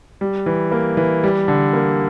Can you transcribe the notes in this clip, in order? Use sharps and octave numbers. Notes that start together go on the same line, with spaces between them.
G3
E3
A#3
E3
G3
D3
A#3